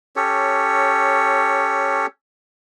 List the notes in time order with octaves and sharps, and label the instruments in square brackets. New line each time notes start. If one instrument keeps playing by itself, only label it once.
[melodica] C#4 G4 A4 C#5